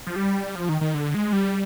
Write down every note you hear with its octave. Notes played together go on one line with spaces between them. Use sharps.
F3
G3
F3
D#3
D#3
D3
G#3
G3